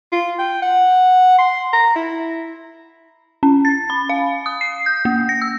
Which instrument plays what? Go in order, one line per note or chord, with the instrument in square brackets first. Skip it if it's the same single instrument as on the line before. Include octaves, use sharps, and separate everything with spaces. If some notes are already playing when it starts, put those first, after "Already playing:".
[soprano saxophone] F4
G5
F#5
C6
A#5
E4
[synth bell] C#4
A6
B5
F5
D#6
C7
G6
A#3
A#6
E6